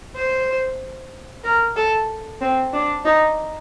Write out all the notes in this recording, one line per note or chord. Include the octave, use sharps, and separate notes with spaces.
C5
A#4
A4
C4
D4
D#4